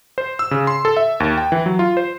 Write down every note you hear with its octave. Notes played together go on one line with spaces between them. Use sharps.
C5
E6
C#3
C6
A4
E5
D#2
G5
E3
F#3
F4
C5